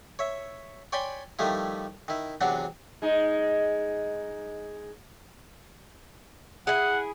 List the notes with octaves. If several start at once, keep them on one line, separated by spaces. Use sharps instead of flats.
C#5 E5
C#5 D5 G5 G#5 B5 C6
D#3 F3 G3 A3 E4
D#3 E4
E2 C3 F#3 D4 F#5
G#3 D#4
E4 G#4 F#5